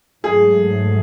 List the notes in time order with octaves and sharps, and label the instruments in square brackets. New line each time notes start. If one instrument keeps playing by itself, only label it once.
[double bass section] G#2 F#3 A3 [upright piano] G#4